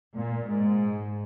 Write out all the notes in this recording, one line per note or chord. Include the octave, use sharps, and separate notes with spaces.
A#2
G#2